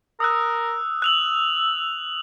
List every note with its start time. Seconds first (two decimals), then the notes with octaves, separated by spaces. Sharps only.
0.20 A#4 D#6 E6 F#6
1.02 E6 F#6 F7 F#7